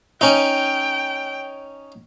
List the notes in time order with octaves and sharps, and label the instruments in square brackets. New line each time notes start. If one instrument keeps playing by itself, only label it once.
[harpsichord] C#4 D#4 [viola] G5